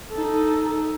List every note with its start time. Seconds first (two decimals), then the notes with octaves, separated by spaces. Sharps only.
0.12 D#4 A4